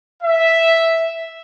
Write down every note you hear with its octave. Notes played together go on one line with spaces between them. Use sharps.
E5